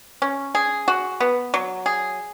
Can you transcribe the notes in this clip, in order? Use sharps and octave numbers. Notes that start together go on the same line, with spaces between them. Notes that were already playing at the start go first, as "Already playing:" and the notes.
C#4
G#4
F#4
B3
F#3
G#4